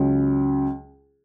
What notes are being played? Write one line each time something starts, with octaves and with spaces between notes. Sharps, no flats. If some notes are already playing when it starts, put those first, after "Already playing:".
Already playing: C#2 C#3 F#3